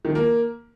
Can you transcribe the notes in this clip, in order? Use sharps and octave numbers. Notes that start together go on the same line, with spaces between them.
D#3
F3
A#3